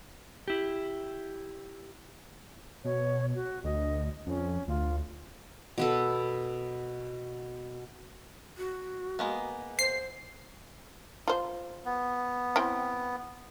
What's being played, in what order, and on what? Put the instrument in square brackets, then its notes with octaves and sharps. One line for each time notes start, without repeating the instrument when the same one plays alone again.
[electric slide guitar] E4 G4
[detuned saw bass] B2 [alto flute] C#5
[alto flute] F#4
[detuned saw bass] D2 [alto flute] D#5
[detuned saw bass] F2 [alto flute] C#4
[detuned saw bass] D2 [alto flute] F4
[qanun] B2 B3 A4
[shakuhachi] F#4
[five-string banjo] G#3 A#3 B3
[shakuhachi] C5 [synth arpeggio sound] C7
[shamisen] F4 C5
[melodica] B3
[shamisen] C4 E4 G5